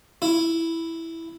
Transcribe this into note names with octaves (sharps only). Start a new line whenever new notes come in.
E4